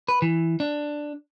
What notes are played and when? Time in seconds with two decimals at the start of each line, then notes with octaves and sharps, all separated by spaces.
0.08 B4
0.22 E3
0.60 D4